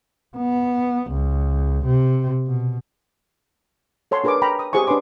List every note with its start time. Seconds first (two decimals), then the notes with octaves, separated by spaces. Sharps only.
0.37 B3
1.11 C#2
1.85 C3
2.47 B2
4.11 A4 C#5 A5 C6
4.24 D4 G#4 A#4 B4 C6 D6
4.42 G5 A#5 B5
4.59 D#6
4.73 G4 G#4 C5 G#5 C#6
4.87 D4 B4 C#5 C6 D6